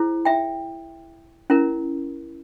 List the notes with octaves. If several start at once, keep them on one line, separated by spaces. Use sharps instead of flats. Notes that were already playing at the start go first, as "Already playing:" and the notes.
Already playing: E4 G#4 C5
E5 G5
C#4 E4 A#4